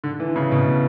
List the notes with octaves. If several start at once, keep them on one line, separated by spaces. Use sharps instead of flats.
D3
E3
C#3
B2